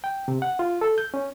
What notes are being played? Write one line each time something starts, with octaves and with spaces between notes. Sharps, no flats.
G5
C3
F#5
F4
A4
G6
C#4